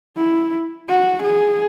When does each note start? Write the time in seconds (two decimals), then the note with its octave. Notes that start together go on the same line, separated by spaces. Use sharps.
0.17 E4
0.89 F#4
1.23 G#4